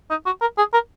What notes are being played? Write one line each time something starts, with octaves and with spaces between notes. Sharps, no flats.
D#4
F#4
A#4
G#4
A#4